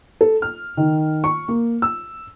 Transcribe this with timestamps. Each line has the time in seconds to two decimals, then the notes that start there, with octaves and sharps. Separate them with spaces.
0.21 A4
0.42 F6
0.77 D#3
1.24 C#6
1.48 A#3
1.82 E6